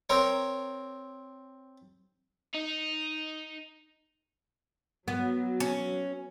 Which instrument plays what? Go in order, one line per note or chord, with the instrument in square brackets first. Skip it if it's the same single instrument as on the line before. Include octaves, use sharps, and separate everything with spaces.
[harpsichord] C4 A#4 C#5
[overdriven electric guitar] D#4
[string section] F#3 [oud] B3
[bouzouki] C#4